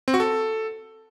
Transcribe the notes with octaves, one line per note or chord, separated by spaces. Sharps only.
C4
F#4
A4